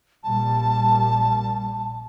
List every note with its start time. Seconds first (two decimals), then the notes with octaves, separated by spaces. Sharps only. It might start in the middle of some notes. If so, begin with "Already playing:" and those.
0.24 A#1 A#2 G3 A5